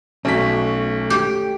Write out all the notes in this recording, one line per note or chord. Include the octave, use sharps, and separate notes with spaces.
B1 A3 C#4 F#4 B6
G4 G5